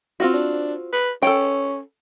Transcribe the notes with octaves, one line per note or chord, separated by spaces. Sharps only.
C4 F4 F#4
D4
B4
C#4 A4 G5